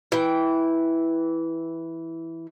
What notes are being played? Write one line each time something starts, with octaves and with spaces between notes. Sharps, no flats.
E3 G5